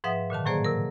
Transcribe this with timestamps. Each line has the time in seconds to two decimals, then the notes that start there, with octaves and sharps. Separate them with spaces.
0.04 G#2 F3 B4 E5 F#5 D#6
0.30 A#2 D3 D#3 A5
0.45 A2 F#3 A#3 G#4 C5 D5
0.65 C3 A#4